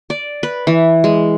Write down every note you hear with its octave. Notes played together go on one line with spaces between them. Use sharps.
D5
B4
E3
G#3